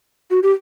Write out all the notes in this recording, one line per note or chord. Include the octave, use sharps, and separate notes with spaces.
F#4
G4